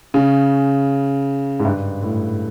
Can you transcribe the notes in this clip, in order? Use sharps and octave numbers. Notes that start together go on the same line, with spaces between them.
C#3
G#2
G2
A2